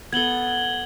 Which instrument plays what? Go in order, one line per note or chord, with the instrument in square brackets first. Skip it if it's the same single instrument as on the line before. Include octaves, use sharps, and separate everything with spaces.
[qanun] B3 A4 [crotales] G#6 F#7 G7